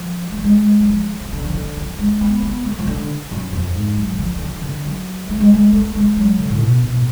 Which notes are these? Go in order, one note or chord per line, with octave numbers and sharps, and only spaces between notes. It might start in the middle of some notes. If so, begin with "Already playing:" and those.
Already playing: F3
A3
G#3
F#3
F3
F3
D3
F3
D3
F3
G#3
B3
B3
A3
F3
D3
F#2
F2
G#2
F#3
D3
F3
D3
F3
D3
F#3
A3
G#3
A3
A3
G#3
F#3
D3
A2
B2
B2
A2